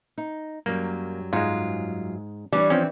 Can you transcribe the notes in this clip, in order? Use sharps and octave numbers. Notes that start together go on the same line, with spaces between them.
D#4
F#2 F#3 G3 A#3
G#2 G#3 F4
E3 G3 D4 C#5
F3 C4 C#4